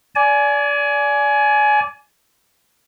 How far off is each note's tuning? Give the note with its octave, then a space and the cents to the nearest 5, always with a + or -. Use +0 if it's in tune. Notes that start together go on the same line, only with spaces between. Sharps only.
D5 -20 G#5 +20